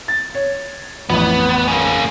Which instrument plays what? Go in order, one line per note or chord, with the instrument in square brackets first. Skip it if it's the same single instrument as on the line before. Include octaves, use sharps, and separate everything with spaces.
[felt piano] A6
C#5
[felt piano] A1 F2 [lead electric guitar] B3
[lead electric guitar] A#3 C#4